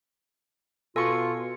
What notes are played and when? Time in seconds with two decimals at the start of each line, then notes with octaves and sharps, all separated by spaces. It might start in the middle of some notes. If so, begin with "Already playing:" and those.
0.96 B2 F4 A4 G#5 C6 C#6 C#7